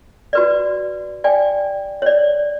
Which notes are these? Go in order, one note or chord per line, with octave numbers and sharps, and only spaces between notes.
F#4 B4 D5
D5 G5 G#5
C#5 D5